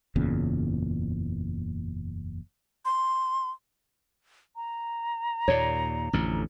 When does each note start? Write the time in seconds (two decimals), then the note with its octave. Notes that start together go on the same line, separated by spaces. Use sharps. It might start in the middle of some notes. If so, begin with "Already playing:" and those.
0.16 F#1 E2 A#2 C#3
2.85 C6
4.56 A#5
5.48 D#2 A#2 C#5 D5
6.13 A1 F2 D3